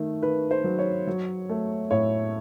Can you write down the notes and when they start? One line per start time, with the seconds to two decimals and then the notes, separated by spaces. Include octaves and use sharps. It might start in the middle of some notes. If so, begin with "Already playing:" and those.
Already playing: D#3 A3
0.22 D#3 B4
0.51 C5
0.64 F#3
0.79 C#5
1.07 F#3
1.49 A3
1.91 A2 C#5